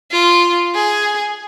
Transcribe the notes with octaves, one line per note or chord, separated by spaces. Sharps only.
F4
G#4